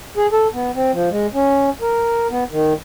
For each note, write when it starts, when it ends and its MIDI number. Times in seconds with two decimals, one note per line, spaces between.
0.17 0.27 68
0.32 0.48 69
0.53 0.71 59
0.75 0.91 60
0.93 1.09 53
1.10 1.27 56
1.34 1.70 61
1.81 2.28 70
2.31 2.44 59
2.51 2.73 51